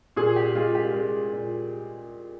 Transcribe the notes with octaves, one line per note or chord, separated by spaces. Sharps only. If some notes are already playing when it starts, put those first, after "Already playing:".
A#2 G#4
G4
G#3 F4
G4
G#3
A#2